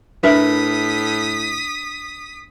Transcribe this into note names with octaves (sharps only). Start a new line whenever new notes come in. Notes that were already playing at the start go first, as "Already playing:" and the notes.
A2 D4 A#4 B4 E5 D#6 B6